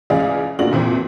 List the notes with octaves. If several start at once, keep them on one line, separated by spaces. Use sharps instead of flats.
C#2 C#3 E3 G#4 D5 F5
F1 A#3 D4 F4 F#4 F#7
F2 A#2 E3 C4